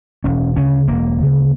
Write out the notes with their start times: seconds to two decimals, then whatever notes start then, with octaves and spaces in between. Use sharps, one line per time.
0.24 E1 C#4
0.56 D2 C#3 C#4
0.87 E1 A#3
1.19 D2 C#3